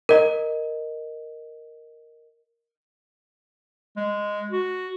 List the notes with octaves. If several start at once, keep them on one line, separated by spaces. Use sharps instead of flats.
A#4 D#5
G#3
F#4